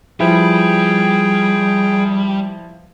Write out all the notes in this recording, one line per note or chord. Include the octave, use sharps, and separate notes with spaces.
F3 G3 E4 G#4 B4 G5